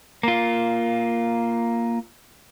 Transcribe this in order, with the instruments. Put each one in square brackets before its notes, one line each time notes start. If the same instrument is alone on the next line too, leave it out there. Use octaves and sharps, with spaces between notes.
[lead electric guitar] A#3 F4